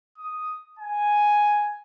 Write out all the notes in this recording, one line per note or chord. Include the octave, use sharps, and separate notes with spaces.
D#6
G#5